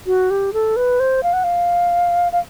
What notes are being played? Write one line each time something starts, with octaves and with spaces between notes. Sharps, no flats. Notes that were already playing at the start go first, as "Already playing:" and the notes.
F#4
G4
A4
B4
C5
F5
F#5
F5
F5